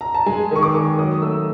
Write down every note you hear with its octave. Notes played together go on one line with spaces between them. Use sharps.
A#5
A5
G#3 G#5
D#3 C#6
D6
D#3
F#3 D#6
A3 E6